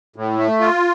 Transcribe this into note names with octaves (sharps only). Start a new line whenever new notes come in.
A2
A3
F4